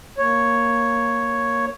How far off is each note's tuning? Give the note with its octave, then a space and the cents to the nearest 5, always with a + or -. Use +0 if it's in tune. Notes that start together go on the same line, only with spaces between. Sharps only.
A#3 +0 C#5 +0